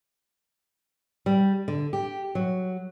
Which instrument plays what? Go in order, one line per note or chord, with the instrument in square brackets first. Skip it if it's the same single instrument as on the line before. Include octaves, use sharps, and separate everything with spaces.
[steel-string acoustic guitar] G3
D3
G4
F#3